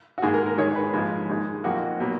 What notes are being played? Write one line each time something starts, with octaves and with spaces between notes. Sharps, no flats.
F#4
G#2 D#3 A#3 G#4
A#4
A#4
G#2 D#3 G#3 C#5
B4
G#2 F3 G#3
G#2 D#3 G#3
F2 F3 A#3 F#4
B2 F#3 A#3